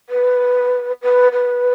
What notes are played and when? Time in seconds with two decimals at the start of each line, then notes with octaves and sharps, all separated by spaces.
0.10 B4
1.02 B4
1.32 B4